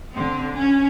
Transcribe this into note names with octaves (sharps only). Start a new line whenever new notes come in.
D3 C4
C#4